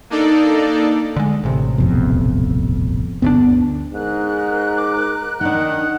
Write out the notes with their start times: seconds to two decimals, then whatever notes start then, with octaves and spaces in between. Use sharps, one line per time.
0.10 A#3 D4 D#4 A4 D5
1.16 D3 G#3
1.44 A1 C3
1.78 D#1 F2 B2
3.22 G1 D2 B3 D4
3.93 G#2 A#4 F#6
4.78 D6
5.41 D#3 D4 D#4 F#5